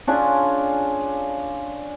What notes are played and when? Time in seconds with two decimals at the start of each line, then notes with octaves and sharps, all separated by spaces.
0.07 C#4 D4 F4 G#4